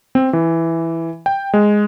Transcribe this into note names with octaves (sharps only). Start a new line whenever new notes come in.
C4
E3
G5
G#3